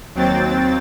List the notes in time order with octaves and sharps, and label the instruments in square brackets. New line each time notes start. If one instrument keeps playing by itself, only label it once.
[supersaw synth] D#2 F#3 C4 G5 A6